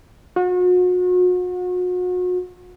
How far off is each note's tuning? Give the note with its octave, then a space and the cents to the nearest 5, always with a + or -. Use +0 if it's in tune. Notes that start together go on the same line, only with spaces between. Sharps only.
F#4 -40